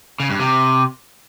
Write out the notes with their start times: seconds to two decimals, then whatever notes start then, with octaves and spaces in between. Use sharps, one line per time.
0.20 C#3
0.30 G2
0.40 C3